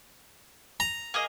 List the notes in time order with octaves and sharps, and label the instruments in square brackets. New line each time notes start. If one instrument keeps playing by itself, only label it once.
[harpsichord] A#5
[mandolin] A#3 G#4 D#5